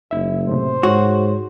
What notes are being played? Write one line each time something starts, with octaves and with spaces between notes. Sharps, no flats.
F#1 D#4 E5
A2 C3 C5
G#2 F#4 C#5